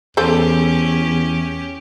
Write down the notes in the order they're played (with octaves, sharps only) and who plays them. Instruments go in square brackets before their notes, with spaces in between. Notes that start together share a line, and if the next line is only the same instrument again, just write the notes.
[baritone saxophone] E2 [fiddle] C#4 G4 [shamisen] A4 C5